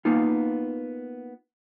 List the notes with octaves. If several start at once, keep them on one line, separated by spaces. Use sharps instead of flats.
A#3 B3 D#4 F4